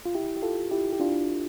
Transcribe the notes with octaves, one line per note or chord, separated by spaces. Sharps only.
F4
E4 G4
G4
F4 A4
E4 G4
G4
D4 F4